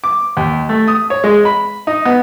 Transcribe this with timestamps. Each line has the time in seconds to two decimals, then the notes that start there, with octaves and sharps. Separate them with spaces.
0.04 D6
0.37 D#2
0.69 A3
0.88 D#6
1.10 C#5
1.24 G#3
1.45 B5
1.87 D#4
2.05 B3